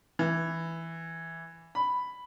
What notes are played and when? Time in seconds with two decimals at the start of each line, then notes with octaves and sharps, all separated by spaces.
0.19 E3
1.75 B5